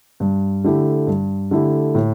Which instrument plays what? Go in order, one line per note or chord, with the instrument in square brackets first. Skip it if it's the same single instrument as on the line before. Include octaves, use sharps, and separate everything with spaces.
[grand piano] G2
D3 A3 E4 G4
G2
D3 A3 E4 G4
A2